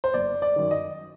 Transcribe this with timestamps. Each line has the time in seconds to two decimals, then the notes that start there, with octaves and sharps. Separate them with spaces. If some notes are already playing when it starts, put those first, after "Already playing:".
0.04 C5
0.14 F#1 D5
0.42 D5
0.56 F#2 D#3
0.71 D#5